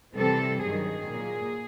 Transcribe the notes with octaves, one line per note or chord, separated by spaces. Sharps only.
C3 E3 G3 C4 A4
G2 D#3 F#3 G#4
A#2 F#3 A#3